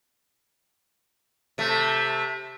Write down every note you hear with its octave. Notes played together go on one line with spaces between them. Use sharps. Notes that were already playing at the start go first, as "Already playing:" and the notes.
C3 A3